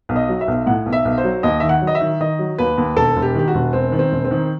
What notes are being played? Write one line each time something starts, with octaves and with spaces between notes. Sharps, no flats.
B1
D#5
F#3
E5
B1
A2 F#5
B1
E5
B1
C5
F#3
D#2 D#5
D#3 E5
F#5
F#3
D#5
E5
D#3
D#3 D#5
F#3
D#2 B4
D#2
E1 A4
E1
G4
D#3 G4
F#4
E1
E1 C4
D#3
C4
E1
C4
D#3